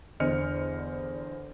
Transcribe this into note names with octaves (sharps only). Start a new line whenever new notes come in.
E2 D3 C5 D#5 F6 C#7